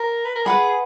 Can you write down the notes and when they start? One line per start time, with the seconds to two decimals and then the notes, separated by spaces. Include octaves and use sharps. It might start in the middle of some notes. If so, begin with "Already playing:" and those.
Already playing: A#4
0.25 B4
0.35 A#4
0.46 G#4 B4 F#5 B5